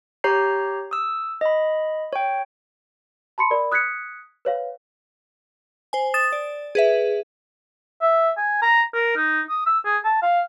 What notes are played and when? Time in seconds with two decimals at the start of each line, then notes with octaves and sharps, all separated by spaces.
0.24 G4 C#5 A#5 G6 C7
0.91 D#6 E6
1.41 D#5 B5
2.13 C#5 G5
3.38 A5 B5 C6 C#7
3.51 A#4 D5 B5
3.72 D#6 F#6 G#6 B6 C#7
4.45 B4 C#5 F5
5.93 C5 G#5
6.14 D#6 A6 E7
6.32 D5
6.75 G#4 B4 E5
8.02 E5
8.37 G#5
8.62 A#5
8.93 A#4
9.16 D#4
9.49 D#6
9.66 E6
9.85 G#4
10.05 A5
10.22 F5